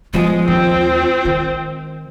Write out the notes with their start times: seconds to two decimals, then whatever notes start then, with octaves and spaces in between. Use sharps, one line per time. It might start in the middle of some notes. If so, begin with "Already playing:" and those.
0.14 F3 G#3 B3 F4
0.48 D#2 C4
1.25 D#3